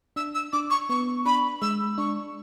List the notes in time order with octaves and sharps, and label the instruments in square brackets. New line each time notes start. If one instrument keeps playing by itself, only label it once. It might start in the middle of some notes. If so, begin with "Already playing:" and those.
[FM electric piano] D4 [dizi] E6
[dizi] E6
[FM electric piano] D4 [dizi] D6
[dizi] C#6
[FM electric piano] B3 [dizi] C#6
[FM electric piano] D4 [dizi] B5
[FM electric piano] G#3 [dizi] E6
[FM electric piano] D4 [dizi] C#6